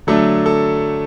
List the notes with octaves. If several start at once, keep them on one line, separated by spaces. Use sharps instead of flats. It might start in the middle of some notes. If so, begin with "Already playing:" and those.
D3 F#3 A3 D4 A4
A4